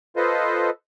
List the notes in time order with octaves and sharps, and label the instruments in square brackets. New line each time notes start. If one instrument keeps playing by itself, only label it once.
[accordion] F4 A4 B4 C5 D#5